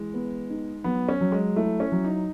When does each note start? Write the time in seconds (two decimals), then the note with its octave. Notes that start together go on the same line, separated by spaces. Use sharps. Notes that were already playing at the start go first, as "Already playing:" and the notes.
Already playing: E3 G#3
0.14 B3
0.50 D#4
0.84 F#3 B3
1.09 C#4
1.21 F#3
1.32 G#3
1.56 A3 E4
1.80 C#4
1.92 F#3
2.04 D#4